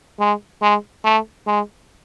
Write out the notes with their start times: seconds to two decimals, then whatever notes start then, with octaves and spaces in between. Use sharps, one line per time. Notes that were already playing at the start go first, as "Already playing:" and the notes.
0.20 G#3
0.62 G#3
1.05 A3
1.47 G#3